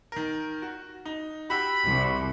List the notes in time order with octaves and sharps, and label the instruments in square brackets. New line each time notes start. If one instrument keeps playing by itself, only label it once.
[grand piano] D#3 A#4
F#4
D#4
[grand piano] F#4 G4 E6 [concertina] B5
[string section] C2